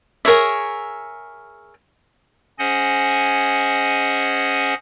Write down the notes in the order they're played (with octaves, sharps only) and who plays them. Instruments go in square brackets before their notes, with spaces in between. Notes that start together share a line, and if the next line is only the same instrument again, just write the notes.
[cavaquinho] G#4 A#4 C#5 E5
[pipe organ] C#4 G#4 C5 D#5 F#5 G#5